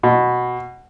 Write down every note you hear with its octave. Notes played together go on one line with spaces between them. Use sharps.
B2